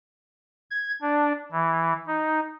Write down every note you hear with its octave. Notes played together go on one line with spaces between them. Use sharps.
G#6
D4
E3
D#4